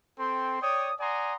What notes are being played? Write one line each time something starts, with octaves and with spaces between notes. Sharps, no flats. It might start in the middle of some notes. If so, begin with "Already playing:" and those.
C4 A4 G5 C6
C#5 D5 G5 D#6
D5 F#5 G#5 A#5 C6 D#6